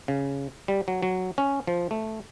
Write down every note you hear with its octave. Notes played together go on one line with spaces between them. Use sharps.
C#3
G3
F#3
F#3
C#4
F3
A3